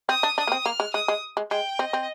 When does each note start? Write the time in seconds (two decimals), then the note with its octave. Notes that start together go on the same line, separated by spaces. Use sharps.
0.09 C4 D#6
0.23 D4
0.38 D4 D#6
0.47 A#3
0.52 C4
0.65 A#3 F6
0.80 G#3
0.94 G#3 D#6
1.08 G#3
1.37 G#3
1.51 G#3 G5
1.79 C4 D#5
1.93 C4